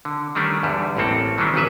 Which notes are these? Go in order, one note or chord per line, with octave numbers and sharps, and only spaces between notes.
D3
D#3 G3 A3 C#4 D4
E2 G#2 D3 G3
A1 A2 A#3 C4 A4
D#3 E3 F#3 G3 C#4 D4
G#1 C#3 F#3 B4 E5